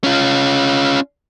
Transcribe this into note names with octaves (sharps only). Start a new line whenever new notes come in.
C#4 F4